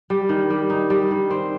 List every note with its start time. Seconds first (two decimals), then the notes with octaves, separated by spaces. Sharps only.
0.10 G3
0.29 D#3
0.50 G3
0.70 D#4
0.90 G3
1.11 D#3
1.31 C4